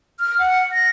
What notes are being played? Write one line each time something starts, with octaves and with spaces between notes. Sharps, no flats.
F6
F#5
A#6